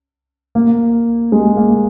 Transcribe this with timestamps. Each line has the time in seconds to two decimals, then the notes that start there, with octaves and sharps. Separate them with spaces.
0.55 A#3
1.32 G#3
1.57 A#3